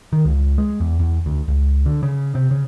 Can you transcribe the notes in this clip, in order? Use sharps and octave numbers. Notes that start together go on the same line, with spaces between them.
D#3
C#2
G#3
E2
E2
D2
C#2
D3
C#3
C3
C#3